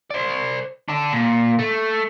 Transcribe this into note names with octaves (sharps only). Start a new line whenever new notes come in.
C5 D5
D4 A4
A#2
A3